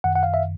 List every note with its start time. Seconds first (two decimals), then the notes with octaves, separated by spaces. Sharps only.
0.04 F#2 D#3 F#5
0.15 F#5
0.23 F5
0.34 E5